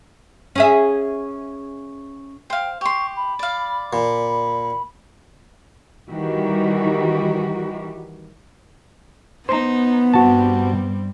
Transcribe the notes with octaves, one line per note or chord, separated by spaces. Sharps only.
C#4 G#4 E5
C5 F5 G5
G4 C6 C#6
B5
D5 F5
A#2 B5
D#3 E3 G3 F#4 G4
B3 D#4 C5 A#5
G2 G3 C4 F#4 A5